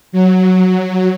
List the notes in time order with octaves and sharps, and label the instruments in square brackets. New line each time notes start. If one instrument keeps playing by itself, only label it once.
[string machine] F#3